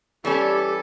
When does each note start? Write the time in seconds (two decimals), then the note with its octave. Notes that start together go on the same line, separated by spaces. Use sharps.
0.25 E3 G3 C#4 G4 A4